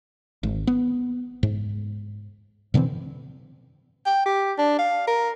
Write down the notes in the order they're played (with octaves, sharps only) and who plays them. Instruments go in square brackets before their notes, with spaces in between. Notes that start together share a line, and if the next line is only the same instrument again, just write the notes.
[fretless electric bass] G#1
B3
G#2
B2 D3 E3 C4
[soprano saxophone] G5
G4
D4
F5
A#4